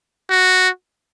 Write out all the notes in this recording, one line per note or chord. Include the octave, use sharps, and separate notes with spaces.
F#4